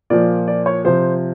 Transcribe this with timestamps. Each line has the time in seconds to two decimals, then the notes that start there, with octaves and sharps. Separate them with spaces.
0.10 A#2 F3 D5
0.48 D5
0.66 C#5
0.85 C3 F3 C5